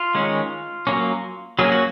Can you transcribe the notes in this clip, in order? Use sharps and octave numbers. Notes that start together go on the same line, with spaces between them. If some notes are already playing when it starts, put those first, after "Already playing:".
Already playing: F4
D#3 G#3 C#4
F#3 A#3 C#4
F#3 A#3 C#4 G#4
F#4